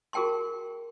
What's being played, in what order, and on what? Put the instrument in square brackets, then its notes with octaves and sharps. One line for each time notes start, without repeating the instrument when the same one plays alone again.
[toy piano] F#4 G#4 A#4 G5 A5 C6